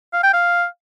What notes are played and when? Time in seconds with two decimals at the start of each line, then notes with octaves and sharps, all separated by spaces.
0.13 F5
0.23 G5
0.33 F5